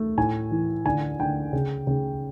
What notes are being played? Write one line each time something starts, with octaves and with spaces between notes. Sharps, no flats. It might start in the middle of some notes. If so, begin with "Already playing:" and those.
Already playing: A3
A2 G#5
E3
D3 G#5
D3 G5
C#3
C#3